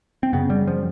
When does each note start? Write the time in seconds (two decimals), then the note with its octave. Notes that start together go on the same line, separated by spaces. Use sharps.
0.23 C4
0.33 F#2 C#3 B3
0.50 G3
0.67 F3